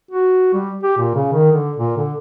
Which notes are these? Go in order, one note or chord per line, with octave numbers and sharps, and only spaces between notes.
F#4
G3
G4
A#2
C#3
D#3
D3
A#2
D3